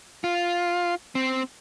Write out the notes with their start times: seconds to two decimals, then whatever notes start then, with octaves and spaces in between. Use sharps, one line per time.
0.24 F4
1.15 C4